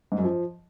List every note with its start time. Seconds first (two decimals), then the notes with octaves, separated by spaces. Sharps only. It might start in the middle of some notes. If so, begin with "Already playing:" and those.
0.12 G#2
0.18 F#2
0.24 F3